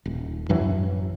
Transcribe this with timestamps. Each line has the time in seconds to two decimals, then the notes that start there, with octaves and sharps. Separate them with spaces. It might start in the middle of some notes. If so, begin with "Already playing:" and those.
0.06 D#1
0.49 A1 F#2 E3 F#3